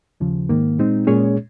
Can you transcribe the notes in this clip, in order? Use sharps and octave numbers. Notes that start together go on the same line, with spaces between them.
D#2 C#3 F3
G#2 D#3 A#3
A#2 G#3 C4 D#4
A#2 G#3 C#4 G#4 C#5